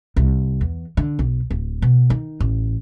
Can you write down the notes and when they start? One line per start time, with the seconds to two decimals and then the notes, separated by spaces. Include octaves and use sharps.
0.16 C2
0.61 E2
0.97 D3
1.19 B1
1.51 D1
1.82 B2
2.10 D#3
2.40 A1